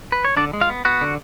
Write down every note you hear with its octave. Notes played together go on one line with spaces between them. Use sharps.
B4
C#5
D3 D4 D5
G#3
F4 F5
B3
B3 F#4 F#5
D3